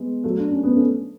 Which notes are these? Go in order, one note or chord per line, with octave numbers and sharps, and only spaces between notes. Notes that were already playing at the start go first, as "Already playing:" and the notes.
Already playing: G#3 B3
F#3 A3
D4
C#4
B3
A3 C#4